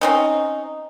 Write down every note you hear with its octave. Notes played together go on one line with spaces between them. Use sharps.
C4 C#4 D#4